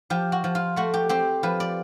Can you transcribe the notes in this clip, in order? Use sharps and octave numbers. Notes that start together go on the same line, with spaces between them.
F3 G4
F#4
F3
F4
A3 F#4
G4
C4 G4
F3 B4
D5